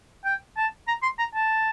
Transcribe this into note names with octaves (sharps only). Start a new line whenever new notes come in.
G5
A5
A#5
C6
A#5
A5